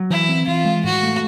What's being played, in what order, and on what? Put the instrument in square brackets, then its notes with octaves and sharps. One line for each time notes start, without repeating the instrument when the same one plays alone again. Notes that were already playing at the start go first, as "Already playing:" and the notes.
Already playing: [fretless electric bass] F#3
[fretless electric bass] E3 [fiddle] E4
[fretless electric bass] C4
[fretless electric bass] E3 [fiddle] F4
[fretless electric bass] G#3
[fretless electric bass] A2 [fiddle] F#4
[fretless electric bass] A3